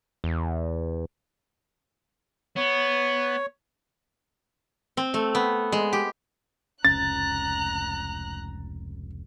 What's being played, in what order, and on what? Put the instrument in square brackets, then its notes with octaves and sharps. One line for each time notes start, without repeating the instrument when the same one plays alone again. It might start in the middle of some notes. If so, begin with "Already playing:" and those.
[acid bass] E2
[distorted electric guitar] B3 [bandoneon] C#5
[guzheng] C4
A3
B3
G#3
G4
[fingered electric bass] F1 C#2 C#4 [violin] A#5 F#6 [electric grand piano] A6